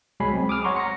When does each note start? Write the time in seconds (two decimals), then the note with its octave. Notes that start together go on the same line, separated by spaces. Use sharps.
0.20 C2 F#3 G#3 G#5 B5 C7
0.33 G#3 C4
0.49 D6 D#6 F6
0.64 C#5 F#5 A#5 C6 C#6
0.76 A#6 C#7